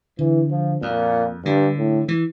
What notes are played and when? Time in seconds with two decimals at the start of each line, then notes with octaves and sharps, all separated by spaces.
0.19 D3 E3
0.51 F3
0.82 F2 A#2
1.45 G2 D3
1.77 A2
2.08 E3